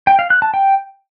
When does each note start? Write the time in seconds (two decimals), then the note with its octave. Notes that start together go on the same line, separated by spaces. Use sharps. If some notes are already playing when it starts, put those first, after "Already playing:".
0.07 G5
0.19 F5
0.30 F#6
0.42 A5
0.54 G5